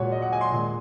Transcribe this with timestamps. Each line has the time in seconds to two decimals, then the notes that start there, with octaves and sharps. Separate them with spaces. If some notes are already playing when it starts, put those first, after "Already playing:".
Already playing: A#2 G#3 F#4 C#5
0.12 D#5
0.22 F#5
0.32 G#5
0.41 C6
0.52 A#2 G#3